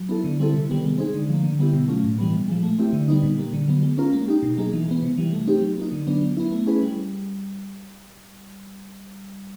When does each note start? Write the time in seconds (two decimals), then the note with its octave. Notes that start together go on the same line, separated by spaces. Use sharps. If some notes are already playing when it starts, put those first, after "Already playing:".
Already playing: F#3
0.09 B3 E4 A4
0.24 D3
0.39 G3 C4 E4 A4
0.54 C3
0.70 D#3 G3 B3
0.84 G#3
0.98 C4 D#4 G#4
1.14 D3
1.29 F3 A#3
1.44 D3
1.59 G3 B3 E4 G4
1.73 B2
1.88 F#3 A3 C#4 F4
2.04 A2
2.18 E3 G3 B3
2.34 A#2
2.48 F3 G#3
2.63 A3
2.79 C4 E4 G4
2.93 D3
3.08 G3 B3 D#4
3.23 A#2
3.38 G3 A#3
3.53 D3
3.68 F#3 B3
3.83 G#3
3.98 C#4 F4 A#4
4.13 A#3
4.28 D#4 G4
4.43 B2
4.57 F#3 A#3 D#4 G#4
4.73 E3
4.88 G#3 B3
5.02 C3
5.18 E3 G3
5.33 A3
5.47 C4 D#4 G4
5.62 F#3
5.77 A#3 D#4
5.92 D3
6.07 F#3 B3 D4
6.21 F#3
6.37 B3 E4
6.52 A3
6.67 C#4 E4 G#4 B4
6.82 G3